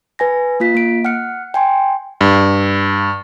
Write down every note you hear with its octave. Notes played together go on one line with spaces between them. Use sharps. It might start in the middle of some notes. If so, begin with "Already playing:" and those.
B4 G#5 A#6
A#3 F4 B6
A#3 D7
F#5 F6 F#6 C#7
G5 G#5 C6
G2